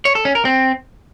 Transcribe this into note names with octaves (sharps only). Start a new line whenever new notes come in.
C#5
A4
C#4
A#4
C4